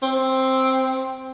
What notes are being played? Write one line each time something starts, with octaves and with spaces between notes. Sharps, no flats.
C4